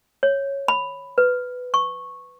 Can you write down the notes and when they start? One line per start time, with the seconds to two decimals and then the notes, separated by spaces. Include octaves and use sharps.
0.23 C#5
0.68 B5
1.18 B4
1.74 C#6